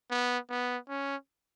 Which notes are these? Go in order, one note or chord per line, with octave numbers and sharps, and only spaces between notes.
B3
B3
C#4